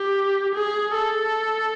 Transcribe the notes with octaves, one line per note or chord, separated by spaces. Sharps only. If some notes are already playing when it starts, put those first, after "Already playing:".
Already playing: G4
G#4
A4